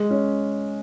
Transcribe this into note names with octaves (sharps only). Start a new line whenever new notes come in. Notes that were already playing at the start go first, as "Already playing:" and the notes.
Already playing: G#3
C#4